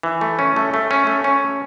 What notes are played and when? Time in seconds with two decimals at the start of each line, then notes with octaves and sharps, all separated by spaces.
0.03 E3
0.21 A3
0.39 C#4
0.56 A3
0.74 A3
0.91 C#4
1.07 A3
1.24 C#4